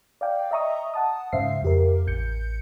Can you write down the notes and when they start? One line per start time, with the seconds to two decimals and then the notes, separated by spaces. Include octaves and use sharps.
0.21 D5 F5 G5
0.51 D#5 E5 A#5 C#6 D#6
0.94 F#5 A5 D#6
1.32 G#2 C#3 C5 E5 F5 C7
1.62 F2 G4 A#4
2.07 A1 G6 C#7